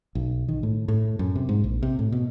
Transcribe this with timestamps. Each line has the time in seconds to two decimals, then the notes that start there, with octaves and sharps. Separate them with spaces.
0.15 B1
0.48 D#3
0.63 A2
0.88 A2
1.19 F#2
1.36 C3
1.49 G#2
1.64 A#1
1.83 C3
1.99 A2
2.12 B2